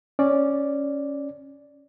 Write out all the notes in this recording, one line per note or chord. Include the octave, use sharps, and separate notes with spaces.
C#4 D5